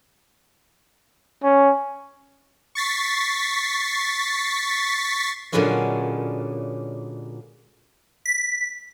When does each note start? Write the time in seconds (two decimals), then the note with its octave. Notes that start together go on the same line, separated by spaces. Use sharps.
1.43 C#4
2.75 C#6 A6 B6 C7
5.52 A#2 D3 F#3 G#3 B3 C#4
8.26 B6